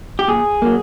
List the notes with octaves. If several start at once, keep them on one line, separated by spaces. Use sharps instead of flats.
G4
A#2 G#4
F#3 A#3